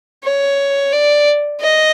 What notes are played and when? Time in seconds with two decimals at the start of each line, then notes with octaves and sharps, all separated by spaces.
0.24 C#5
0.92 D5
1.60 D#5